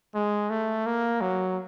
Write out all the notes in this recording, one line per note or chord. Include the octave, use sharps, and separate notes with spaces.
G#3
A3
A#3
F#3